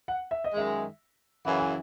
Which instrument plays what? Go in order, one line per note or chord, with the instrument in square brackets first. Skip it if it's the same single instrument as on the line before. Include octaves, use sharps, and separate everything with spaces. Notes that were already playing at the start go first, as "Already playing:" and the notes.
[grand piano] F#5
E5
D#5
[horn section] F#2 D#3 G#3 [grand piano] E5
[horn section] F#2 C#3 E3 [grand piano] F#5
[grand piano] G#5